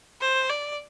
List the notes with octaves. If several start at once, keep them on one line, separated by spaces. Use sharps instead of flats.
C5
D5